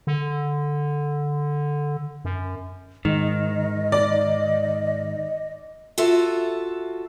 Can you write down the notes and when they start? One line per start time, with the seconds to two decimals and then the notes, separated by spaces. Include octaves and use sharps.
0.07 D3
2.25 F#2
3.05 G#2 D#3 D#5
3.92 D5
5.98 F4 F#4 A4 E5